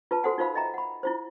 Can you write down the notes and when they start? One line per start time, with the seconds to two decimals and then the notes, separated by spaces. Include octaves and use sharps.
0.11 F4 B4 A5
0.23 F#4 A4 C5 F#5 G#5
0.38 D#4 F4 A#4 C5 F5 B5
0.55 D#5 E5 G5 A#5
0.74 F#5 B5
1.03 E4 F4 C5